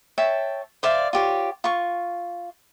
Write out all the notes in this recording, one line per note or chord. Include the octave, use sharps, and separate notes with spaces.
C#5 E5 G5 A5
C5 D5 E5 F5
F4 G4 C#5
F4 C#6